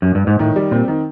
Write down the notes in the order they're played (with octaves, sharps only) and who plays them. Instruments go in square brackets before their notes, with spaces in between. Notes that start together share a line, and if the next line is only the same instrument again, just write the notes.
[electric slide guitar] F#2
G2
G#2
[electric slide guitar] A2 [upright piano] D#3
[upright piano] G3
[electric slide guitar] A#2 [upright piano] C4
[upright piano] D#3